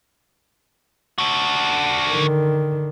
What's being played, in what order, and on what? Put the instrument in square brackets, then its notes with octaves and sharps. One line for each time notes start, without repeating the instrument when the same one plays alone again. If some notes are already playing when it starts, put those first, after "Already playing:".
[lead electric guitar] D4 F#4
[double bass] D3 D#3